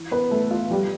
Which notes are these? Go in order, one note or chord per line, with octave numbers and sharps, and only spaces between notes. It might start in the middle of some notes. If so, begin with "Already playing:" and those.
Already playing: E3
B3 B4
E3 A3 A4
F4
F3 G3 G4